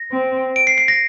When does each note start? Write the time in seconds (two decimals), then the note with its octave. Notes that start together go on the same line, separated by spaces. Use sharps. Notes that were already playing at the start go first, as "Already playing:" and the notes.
Already playing: A#6
0.12 C4
0.56 D7
0.67 C7
0.78 C7
0.88 A#6